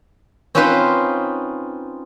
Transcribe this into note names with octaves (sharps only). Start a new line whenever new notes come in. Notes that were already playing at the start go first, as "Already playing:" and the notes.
C4 C#4 D#4 F4 B4 C5